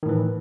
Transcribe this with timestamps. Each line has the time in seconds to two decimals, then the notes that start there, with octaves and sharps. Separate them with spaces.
0.03 D#3
0.06 A2
0.09 E3